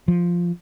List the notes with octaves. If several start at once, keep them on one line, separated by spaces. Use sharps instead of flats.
F3